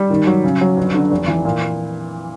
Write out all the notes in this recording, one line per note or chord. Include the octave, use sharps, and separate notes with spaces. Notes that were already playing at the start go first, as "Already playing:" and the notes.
Already playing: G3
D#3
F#3
C#3
F#3
G1
D3
F1
E3
A#2